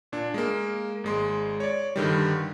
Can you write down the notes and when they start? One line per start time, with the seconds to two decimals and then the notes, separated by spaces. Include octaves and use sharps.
0.12 A#2 D4
0.34 G#3 A#3
1.04 G#1 G#3 C6
1.60 C#5 D5
1.96 G2 D3 D#3 G3